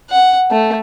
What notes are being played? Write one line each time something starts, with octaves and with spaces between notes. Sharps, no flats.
F#5
A3